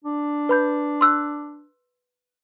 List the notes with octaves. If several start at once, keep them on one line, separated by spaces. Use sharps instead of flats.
D4
B4 B5 G6
C6 E6 F#6